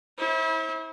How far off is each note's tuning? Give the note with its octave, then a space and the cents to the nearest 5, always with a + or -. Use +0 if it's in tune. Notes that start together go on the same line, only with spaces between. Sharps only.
E4 -35 C5 +35